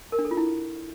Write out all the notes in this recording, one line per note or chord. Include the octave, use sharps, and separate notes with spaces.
A#4
D4
A4
F4
E4